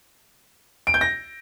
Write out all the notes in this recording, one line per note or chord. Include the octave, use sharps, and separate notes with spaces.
D7
G6
A#6